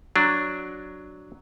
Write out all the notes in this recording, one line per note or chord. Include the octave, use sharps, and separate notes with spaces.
F#3 D4